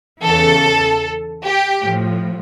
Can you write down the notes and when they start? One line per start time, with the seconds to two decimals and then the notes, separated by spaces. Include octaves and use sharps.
0.24 E2 C#3 E3 A4
1.44 G4
1.84 A2 F3